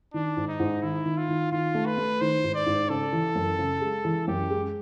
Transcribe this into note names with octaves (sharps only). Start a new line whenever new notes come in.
D#3 D4
G#2
D#4
G#2
D#3 E4
D#3
F4
D#3
D#3 F4
A3
B4
A3
D#3 C5
G#2
D5
G#2
C#3 A4
E3
F#2
C#3
G#3
E3
F#2 G4
G#3